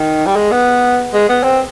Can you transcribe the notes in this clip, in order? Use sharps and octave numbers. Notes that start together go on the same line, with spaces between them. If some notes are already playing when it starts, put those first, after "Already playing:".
Already playing: D#3
G3
G#3
B3
G#3
B3
C4